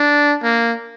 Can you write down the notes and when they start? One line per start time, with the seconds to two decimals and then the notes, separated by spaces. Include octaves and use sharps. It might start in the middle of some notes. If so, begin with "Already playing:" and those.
Already playing: D4
0.43 A#3